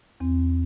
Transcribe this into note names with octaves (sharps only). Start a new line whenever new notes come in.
E2 C4